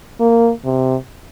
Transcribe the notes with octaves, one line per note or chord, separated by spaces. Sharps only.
A#3
C3